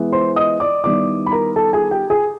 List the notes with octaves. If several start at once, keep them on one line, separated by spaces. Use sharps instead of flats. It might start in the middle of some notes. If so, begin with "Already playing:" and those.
Already playing: E3 G#3 B3
C5 C6
D#5 D#6
D5 D6
D#3 G3 B3 E4 D5 D6
B5
A#4 A#5
A4 A5
G#4 G#5
G4 G5
G#4 G#5